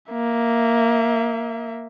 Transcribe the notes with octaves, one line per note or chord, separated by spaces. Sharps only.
A#3 E5